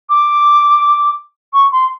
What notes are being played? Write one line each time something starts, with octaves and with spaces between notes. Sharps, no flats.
D6
C#6
C6